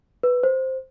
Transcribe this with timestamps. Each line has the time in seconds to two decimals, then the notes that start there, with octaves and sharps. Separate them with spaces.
0.23 B4
0.43 C5